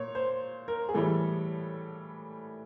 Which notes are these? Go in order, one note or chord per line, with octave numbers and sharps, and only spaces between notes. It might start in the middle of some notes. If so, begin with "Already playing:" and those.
Already playing: A#2 C#5
C5
A#4
G#4
A2 E3 G3 A4